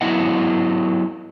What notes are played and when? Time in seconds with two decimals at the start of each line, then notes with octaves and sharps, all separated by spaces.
0.01 F#3 B3 E4 D#5 F#5